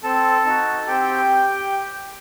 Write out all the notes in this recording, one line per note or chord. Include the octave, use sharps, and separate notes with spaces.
C4 A4 A5
D#4 F#4
C4 G4 G5